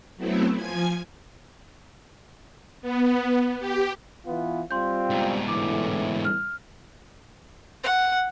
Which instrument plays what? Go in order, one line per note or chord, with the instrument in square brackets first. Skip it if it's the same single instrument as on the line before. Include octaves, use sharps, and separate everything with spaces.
[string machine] F#3 A3 B3 C4 E4
F3 G#5 G#6
B3
G4
[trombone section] E3 B3 F4
[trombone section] G3 C4 F4 [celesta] C6 G6
[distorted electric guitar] G#2 B2
[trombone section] A2 D3 E3 [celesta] D6
[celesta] F6
[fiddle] F#5